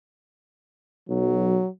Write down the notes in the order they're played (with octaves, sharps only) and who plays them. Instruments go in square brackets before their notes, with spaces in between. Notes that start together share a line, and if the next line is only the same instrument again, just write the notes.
[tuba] B1 [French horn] F#3